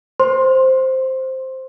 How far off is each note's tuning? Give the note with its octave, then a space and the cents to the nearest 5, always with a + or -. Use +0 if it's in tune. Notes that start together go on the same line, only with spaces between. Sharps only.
C5 +0 C6 +15